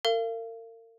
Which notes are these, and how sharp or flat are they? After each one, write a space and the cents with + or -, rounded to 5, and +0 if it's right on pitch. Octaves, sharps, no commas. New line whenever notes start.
A#4 -40 F5 -35